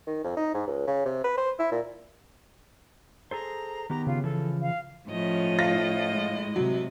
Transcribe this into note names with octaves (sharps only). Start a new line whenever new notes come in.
D#3
F2
D#4
G#2
C#2
C#3
C3
B4
C5
E4
A#2
G#4 A4 C5 A#5
D#3 B3 G4 A#5
C#3 F4
E3 F3 A4
F5
A2 F3 C#4 D#5
F4 A#6
G#3
C3 F#3